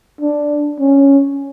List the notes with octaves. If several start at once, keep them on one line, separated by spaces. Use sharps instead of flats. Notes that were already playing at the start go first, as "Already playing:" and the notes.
D4
C#4